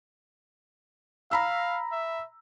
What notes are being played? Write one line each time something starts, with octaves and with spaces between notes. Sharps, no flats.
F5 A#5 B5 E6
E5